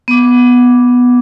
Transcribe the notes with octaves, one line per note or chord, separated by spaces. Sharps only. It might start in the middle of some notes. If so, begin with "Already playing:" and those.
B3 D6